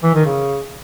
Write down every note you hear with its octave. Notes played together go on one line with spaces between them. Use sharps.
E3
D#3
C#3